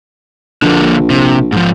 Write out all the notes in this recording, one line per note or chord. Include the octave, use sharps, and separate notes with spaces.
A#1 D3 F3 A#3
C3
G#2 F3